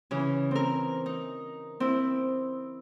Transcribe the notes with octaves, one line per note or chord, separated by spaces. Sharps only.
C#3 E3
C4 A#4
D#4
C4 E4